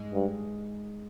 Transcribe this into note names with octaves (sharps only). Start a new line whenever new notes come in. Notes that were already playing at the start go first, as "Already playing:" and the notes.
Already playing: G#2 G#3
G2